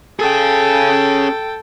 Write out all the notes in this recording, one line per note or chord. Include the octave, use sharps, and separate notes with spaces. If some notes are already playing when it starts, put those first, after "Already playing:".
C#4 G#4 A4 G5